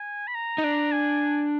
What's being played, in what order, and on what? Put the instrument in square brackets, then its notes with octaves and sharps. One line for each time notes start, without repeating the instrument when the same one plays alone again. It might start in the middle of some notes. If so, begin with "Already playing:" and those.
Already playing: [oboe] G#5
B5
A#5
[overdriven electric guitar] D#4
D4
[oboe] G#5